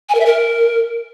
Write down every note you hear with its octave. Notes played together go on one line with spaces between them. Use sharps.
G#5
A#4
E5
A#4